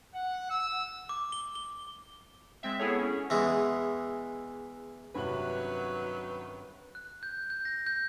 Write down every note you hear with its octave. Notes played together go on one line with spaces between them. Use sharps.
F#5
E6
D6
G7
G7
G#3 C4 E5
B3 E4 G#4 A4 C#5
C#4
E2 E3 G#3
G2 C3 D#3 F#3 C#4 B4 F#7
F#6
G6
G6
A#6
G6